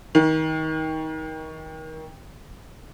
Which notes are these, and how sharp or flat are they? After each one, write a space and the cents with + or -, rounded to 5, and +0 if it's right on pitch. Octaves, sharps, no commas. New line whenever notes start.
D#3 +25